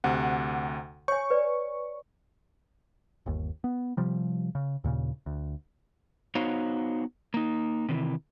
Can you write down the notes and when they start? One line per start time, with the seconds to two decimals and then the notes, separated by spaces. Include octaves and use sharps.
0.04 D2 C3 F#5
1.08 C#5 G#5 C#6
1.30 B4 D5
3.26 G1 D#2
3.64 B3
3.97 C3 F3 G3
4.55 C#3
4.84 D#2 A#2 C#3
5.26 D2
6.35 B3 D#4 F#4 C5 C#5 F5
7.34 A#3 D#4
7.89 C3 D#3 E3